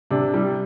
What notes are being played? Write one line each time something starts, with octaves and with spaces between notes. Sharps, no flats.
C3 D4
G3